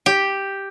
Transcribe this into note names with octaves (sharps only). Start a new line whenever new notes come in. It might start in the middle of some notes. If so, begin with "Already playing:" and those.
G4